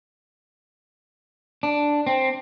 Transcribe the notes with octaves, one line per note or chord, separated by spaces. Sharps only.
D4
C4